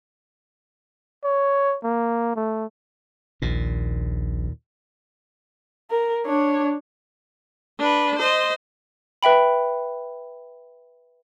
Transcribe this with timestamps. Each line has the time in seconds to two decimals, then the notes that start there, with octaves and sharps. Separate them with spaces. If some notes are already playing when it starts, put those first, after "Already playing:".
1.24 C#5
1.84 A#3
2.36 A3
3.42 A#1 D#2 A#2
5.90 A#4
6.26 D4 C#5
7.80 D4 B4
8.19 C5 D#5
9.23 B4 E5 G5 B5